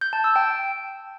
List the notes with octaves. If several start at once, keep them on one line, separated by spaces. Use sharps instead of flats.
G6
A5
E6
G5